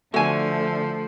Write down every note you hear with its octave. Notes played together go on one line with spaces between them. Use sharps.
D3 F3 A3 F#4 G#5